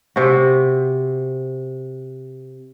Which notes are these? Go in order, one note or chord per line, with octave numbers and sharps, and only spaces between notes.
C3 F#4